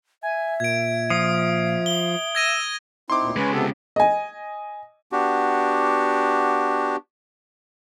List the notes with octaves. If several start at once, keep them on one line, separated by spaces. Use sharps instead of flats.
E5 G#5
A#2 G#6 D7
F3 D#6
G7
E6 G#6 A#6 D#7
C4 D#4 E4 C6 D6
D2 A#2
C#3 G#3 C#4 B4 G#5
C3 B3 G4 A4 D#6
D#5 G#5
B3 D4 F#4 G4